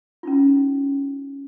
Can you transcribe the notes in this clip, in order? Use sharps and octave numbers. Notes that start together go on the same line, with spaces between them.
C#4 D#4 F4